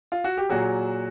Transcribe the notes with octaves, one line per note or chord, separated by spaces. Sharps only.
F4
F#4
G4
A#2 F#3 F#4 G#4